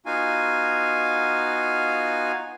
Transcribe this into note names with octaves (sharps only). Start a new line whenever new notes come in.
B3 D#4 F4 F#4 F5 G#5